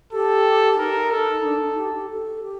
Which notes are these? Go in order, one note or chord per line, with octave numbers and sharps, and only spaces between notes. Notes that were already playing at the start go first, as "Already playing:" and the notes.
G4 A4
D#4 A#4
A4
D4
D#4
G4
G4
A4
G4